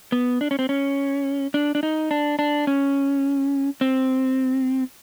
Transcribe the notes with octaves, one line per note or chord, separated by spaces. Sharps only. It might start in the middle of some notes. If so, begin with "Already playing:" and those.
B3
D4
C#4
C4
C#4
D4
D4
D#4
D4
D4
C#4
C4